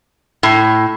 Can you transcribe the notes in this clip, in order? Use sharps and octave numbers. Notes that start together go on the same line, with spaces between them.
A2